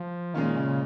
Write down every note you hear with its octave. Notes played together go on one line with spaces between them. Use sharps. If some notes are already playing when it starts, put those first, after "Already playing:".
Already playing: F3
A#2 D#3 G#3 C#4 F4
C#3